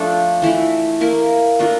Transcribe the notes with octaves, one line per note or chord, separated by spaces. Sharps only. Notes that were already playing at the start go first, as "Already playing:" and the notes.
Already playing: F3 A3 D4 A4
E3 A3 E4
A#3 E4 A#4
A3 D4 F4 A#4